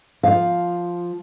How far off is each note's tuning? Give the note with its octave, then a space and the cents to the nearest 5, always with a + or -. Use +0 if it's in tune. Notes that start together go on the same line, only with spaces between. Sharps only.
F3 +0 F5 +10